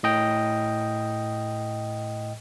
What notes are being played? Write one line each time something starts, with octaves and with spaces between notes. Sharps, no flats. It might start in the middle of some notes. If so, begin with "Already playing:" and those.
A2 D#5 G5